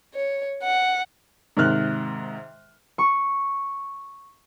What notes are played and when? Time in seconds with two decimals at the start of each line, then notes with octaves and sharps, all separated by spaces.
0.15 C#5
0.63 F#5
1.57 G#2 C3 D#3 F6 F#6
2.98 C#6